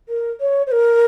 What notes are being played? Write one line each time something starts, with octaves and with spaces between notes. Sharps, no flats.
A#4
C#5
C5
A#4